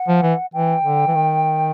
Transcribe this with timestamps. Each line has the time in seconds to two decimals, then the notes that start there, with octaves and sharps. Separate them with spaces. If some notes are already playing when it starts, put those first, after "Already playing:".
Already playing: F#5
0.08 F3
0.23 E3
0.53 E3 G5
0.84 D3
1.08 E3
1.15 D#3